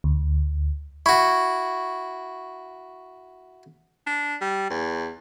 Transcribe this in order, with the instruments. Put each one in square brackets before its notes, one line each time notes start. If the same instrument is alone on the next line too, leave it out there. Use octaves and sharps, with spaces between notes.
[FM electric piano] D2
[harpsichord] E4 F#4 [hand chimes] C#6
[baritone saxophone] D4
G3
E2